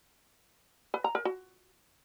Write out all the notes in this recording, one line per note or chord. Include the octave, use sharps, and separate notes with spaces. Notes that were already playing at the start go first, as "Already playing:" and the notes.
B4
A#5
A#4
F#4